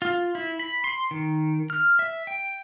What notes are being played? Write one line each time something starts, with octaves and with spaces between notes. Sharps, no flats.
F4
E4
B5
C6
D#3
F6
E5
G5